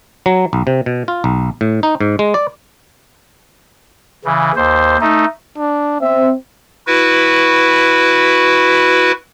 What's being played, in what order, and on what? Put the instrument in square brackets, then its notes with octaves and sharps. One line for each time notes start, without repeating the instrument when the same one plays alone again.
[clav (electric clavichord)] F#3
B1
C3
B2
F4
B1
A2
D#4
G#2
G#3
D5
[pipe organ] C#3 E3
D#2 C5
A3 D#4
[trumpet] D4
[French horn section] C4 [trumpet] E5
[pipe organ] E4 F#4 B4